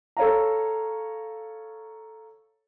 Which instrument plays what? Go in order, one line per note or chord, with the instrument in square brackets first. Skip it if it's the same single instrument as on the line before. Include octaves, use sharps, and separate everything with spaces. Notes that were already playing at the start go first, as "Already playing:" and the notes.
[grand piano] A4 C#5 F5 A#5